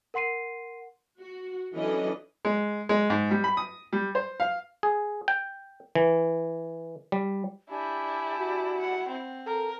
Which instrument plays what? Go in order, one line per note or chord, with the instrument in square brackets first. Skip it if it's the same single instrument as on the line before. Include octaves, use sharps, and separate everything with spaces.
[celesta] A#4 F#5 C6 C7 D#7
[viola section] F#4
E3 F#3 C#4 D4 A4 D#5
[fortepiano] G#3
G#3
G#2
G3
B5
D#6
G3
C5
F5
[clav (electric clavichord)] G#4
G5
E3
G3
[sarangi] D4 [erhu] E4 [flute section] G4 D5 G#5
[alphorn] F#4
[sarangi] F#5
C4
[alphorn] A4 [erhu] A#4